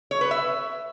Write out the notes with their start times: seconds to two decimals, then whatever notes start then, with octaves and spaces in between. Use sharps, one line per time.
0.11 C#5
0.21 B4
0.31 E5